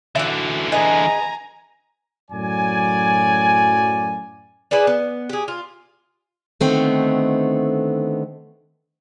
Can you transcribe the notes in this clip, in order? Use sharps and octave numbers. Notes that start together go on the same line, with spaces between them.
D3 E3 F#4 E5
G#4 B4 D#5 G#5 A#5
F#2 A2 F#3 D5 G#5
E4 G#4 B4 D5
B3
G4 G#4
F4
D3 D#3 A3 B3 C4